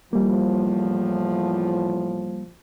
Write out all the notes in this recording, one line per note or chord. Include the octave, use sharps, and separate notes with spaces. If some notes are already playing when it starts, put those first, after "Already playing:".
E2 A2 F3 G3 A#3